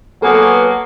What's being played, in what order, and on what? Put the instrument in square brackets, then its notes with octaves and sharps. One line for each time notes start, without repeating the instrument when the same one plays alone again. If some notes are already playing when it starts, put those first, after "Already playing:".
[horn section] F#3 A#3 B3 [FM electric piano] A4 B4 G#5